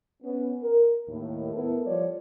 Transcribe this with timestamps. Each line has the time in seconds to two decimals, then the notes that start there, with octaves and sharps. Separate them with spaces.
0.23 B3 C#4
0.63 A#4
1.09 D#2 A2
1.54 B3 E4 A4 A#4
1.86 F3 G3 C#5 D5